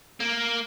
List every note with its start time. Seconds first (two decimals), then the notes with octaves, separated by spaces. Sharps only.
0.20 A#3